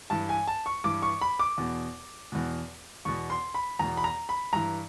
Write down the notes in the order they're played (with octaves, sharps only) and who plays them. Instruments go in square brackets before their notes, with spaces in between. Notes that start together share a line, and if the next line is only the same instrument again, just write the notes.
[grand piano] G2 E3 A5
G#5
A5
C#6
G2 E3 D6
C#6
B5
D6
E2 B2
E2 B2
E2 B2 C#6
C6
B5
E2 B2 A#5
B5
A#5
B5
G2 E3 A#5